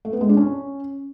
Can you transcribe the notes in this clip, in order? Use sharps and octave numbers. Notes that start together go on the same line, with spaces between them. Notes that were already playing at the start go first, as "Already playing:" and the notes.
A3
B3
G#3
D4
C#4